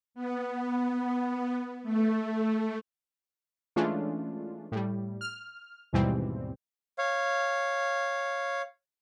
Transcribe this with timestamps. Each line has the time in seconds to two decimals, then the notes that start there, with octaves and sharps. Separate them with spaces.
0.14 B3
1.83 A3
3.76 E3 G#3 A3 C#4 D4 F4
4.72 A2 G3
5.21 F6
5.93 D#2 G#2 B2 E3 G3 C4
6.98 C#5 F5